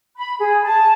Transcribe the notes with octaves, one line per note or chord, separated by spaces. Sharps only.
B5
G#4
A5